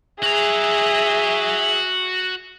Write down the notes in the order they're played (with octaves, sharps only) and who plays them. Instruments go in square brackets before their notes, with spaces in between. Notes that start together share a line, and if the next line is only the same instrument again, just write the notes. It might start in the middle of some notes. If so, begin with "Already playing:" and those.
[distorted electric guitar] F#4 A#5 [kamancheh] G#4 E5